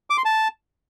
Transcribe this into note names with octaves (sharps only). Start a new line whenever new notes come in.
D6
C6
A5